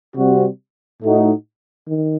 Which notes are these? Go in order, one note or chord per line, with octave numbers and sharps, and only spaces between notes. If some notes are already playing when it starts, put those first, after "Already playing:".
C3 G3 C4 F#4
A2 A3 D#4 F#4
D#3